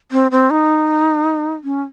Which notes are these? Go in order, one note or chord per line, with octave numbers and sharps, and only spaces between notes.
C4
C4
D#4
C#4